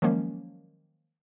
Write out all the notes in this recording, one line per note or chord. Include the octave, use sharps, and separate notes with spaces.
D#3 F3 F#3 G#3 A#3 C#4